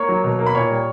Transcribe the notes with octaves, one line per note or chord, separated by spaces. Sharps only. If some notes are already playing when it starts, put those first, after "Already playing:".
Already playing: A#3 C#5 C#6
F#3
B2
A#3
B5
A#2 C#5 C#6
G3